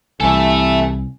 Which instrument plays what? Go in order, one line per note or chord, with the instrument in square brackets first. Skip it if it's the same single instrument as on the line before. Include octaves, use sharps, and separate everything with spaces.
[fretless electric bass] C2 [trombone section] C3 E3 [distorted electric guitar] A4 E5 [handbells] G#5